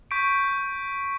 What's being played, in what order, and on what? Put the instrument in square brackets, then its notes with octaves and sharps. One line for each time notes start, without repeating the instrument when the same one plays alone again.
[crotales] C#6 G6 B6 D7